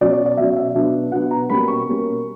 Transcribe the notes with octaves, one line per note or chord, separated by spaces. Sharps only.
B2 F#3 C#4 D5
D5
D5
B2 F#3 C#4 E5
E5
B2 F#3 B3 D4
B2 F#3 B3 D4 F#5
A#5
B2 G3 A#3 C#4 B5
C#6
B2 G3 A#3 C#4